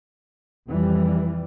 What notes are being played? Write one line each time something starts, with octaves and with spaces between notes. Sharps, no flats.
F2 E3 G3